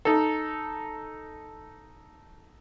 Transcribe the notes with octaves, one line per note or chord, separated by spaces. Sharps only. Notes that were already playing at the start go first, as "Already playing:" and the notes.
D#4 A4